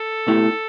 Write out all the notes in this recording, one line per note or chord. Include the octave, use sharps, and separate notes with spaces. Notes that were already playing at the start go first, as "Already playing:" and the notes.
Already playing: A4
B2 A3 E4 G4